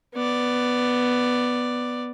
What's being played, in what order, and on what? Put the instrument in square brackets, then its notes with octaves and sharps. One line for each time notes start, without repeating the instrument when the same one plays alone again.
[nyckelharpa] B3 D5